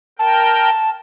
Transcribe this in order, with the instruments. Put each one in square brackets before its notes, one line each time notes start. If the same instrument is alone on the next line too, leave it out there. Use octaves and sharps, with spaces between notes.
[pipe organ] A#4 G5 [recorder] A5